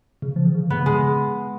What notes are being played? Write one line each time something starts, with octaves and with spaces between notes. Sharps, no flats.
C#3
F3
D#3
C#3
C#3 B3
C#3 G#3